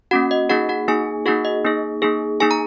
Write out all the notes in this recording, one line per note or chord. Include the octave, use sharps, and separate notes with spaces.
A#3 C#4 F#4 F#5
D#5
A#3 D#4 F#4 G#4 F#5
F#4 F#5
A#3 D#4 G#4 G#5
A#3 D#4 F#4 G#4 F#5
D#5
A#3 D#4 G#4
A#3 D#4 G#4
A#3 D#4 G#4 G#5
A#5